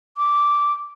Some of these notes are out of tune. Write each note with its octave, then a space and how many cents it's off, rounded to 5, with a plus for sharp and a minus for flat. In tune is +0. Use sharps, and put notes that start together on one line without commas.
D6 -10